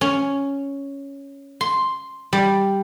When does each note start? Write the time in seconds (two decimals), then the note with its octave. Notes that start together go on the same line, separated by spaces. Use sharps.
0.01 C#4
1.61 C6
2.33 G3